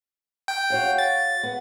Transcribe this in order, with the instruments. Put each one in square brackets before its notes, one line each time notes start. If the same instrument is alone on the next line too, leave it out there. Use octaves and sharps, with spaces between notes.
[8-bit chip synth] G5
[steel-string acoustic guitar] F#4 C#5 F5
[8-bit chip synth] A6
[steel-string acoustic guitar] B3